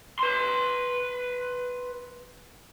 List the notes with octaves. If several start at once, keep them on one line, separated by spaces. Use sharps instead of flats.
B4 C6